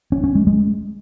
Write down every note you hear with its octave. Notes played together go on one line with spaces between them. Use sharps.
C#4
C#4
G#3
G#3